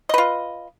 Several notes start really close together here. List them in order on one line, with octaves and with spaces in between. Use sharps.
D#5 B4 F4